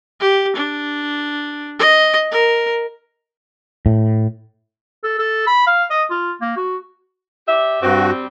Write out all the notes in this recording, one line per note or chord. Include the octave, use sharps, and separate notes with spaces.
G4
D4
D#5
A#4
A2
A4
A4
B5
F5
D#5
F4
A#3
F#4
G4 D5 E5
G2 G3 C4 F#4